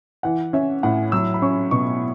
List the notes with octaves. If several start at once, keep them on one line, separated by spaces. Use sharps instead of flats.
E3 F#5
C#4 E5
A2 F#5
F#3 E6
B5
C#4 C#6
B2 C#6